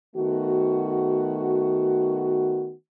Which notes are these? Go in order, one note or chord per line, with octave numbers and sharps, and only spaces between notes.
D#3 A3 B3 F#4